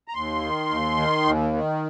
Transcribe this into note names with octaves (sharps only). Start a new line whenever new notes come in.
A#5
D#2 C6
D#3
D#2
D#3
D#2
D#3